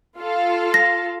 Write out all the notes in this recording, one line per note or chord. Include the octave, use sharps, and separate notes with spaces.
F4 A4 F5
A#6